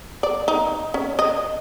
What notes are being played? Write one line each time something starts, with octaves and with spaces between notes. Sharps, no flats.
D5
D#4
C#4
D#5